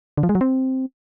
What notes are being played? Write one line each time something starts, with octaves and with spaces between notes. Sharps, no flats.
D3
F3
G#3
F#3
C4